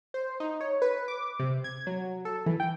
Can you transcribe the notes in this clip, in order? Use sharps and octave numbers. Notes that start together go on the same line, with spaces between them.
C5
D#4
C#5
B4
D6
C3
G#6
F#3
A4
E3
G5